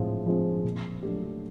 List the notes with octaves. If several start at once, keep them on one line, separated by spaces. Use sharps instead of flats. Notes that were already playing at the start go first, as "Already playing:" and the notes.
Already playing: A2 F3 G#3 C4 F4
F3 G#3 C4 F4
A#2
F#3 A3 D4 G4